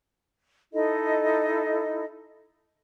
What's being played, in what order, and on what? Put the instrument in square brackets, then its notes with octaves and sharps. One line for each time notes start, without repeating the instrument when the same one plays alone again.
[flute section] D#4 E4 A4 D#5